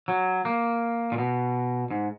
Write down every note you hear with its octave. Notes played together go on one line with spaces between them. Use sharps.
F#3
A#3
A#2
B2
G#2